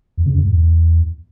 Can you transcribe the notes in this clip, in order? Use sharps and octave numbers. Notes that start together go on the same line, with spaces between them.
E2
C#3
E2
G#2
E2